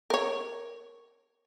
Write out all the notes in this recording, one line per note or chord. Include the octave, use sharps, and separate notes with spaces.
A#4 C#5